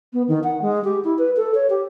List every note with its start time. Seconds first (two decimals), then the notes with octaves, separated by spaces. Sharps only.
0.13 B3
0.28 D#3
0.44 F#5
0.62 G#3
0.84 G4
1.04 E4
1.18 B4
1.36 A4
1.54 C#5
1.70 G4